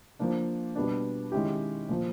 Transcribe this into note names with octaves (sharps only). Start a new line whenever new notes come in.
F3 A#3 D4
B2 G3 B3 D4
D#3 G#3 C#4 E4 G4
A#2 F3